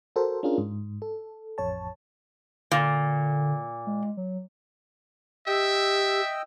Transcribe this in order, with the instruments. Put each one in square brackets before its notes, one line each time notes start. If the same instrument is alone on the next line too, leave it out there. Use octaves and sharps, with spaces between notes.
[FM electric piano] F#4 A4 A#4 C5
C#4 D4 F4 G#4 A#4
G#2
A4
A1 F2 C#5 A5
[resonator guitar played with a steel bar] A#2 [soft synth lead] D3
[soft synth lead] G#3
F#3
[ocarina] G4 [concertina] D#5 G5 E6 [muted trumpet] E5